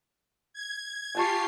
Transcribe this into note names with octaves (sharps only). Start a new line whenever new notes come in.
G#6
F4 G4 G#5 A5 C#6 C7